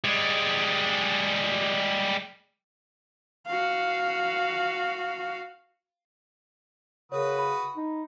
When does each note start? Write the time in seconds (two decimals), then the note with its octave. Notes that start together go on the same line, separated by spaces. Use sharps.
0.04 G3 G#3
3.47 F#4 F5
7.12 C#3 F#4 A#4 B4 C#5 D#6
7.39 B5
7.76 D#4